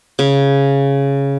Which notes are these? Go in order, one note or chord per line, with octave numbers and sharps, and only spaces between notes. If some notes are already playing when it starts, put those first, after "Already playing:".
C#3